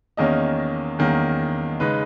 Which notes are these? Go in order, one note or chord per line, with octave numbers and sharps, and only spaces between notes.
E2 D#3 A#3 C#4 D#5
E2 D#3 A#3 C#4
C#3 G#3 D#4 B4